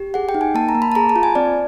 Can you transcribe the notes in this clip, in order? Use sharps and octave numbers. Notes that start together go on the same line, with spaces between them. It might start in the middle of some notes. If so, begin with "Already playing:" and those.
Already playing: G4
G#4 F#5
G5
D#4
G#5
A#3 A5
A#5
A#3
B5
A5
G#4 A#5
A5
F4
G#5
C4 D5